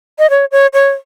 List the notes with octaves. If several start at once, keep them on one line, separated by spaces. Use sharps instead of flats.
D#5
C#5
C#5
C#5